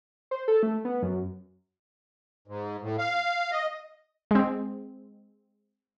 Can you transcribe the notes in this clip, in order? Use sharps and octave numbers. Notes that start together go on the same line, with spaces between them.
C5
A4
A3
B3
F#2
G#2
A2
F5
D#5
G#3 C4